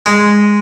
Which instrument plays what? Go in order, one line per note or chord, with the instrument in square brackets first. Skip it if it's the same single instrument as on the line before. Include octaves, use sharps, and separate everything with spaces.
[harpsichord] G#3